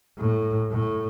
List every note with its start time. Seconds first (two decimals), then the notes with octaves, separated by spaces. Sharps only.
0.18 A2
0.71 A2